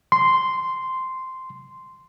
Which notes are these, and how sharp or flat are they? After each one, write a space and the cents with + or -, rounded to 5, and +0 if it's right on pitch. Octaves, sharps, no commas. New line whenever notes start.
C6 -5